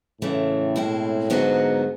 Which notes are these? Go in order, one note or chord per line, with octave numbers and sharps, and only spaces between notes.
A2 C#3 E3 A3
B2 G#3 C4 E4
G#2 D3 F#3 B3 D#4 F#4